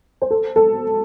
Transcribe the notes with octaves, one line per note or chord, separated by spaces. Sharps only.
C5
A4
A4